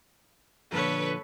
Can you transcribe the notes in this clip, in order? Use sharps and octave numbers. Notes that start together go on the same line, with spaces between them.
A#2 D3 F3 A4 B4 C#5